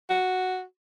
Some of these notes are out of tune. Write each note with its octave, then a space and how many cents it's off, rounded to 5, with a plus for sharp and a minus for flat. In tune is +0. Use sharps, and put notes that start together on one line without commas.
F#4 +0